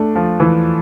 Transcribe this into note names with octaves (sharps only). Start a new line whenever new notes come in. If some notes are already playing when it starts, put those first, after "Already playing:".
Already playing: A3 D4
F3
E3